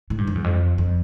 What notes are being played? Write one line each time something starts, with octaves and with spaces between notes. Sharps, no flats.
A2
G2
F2
E2
F2
F2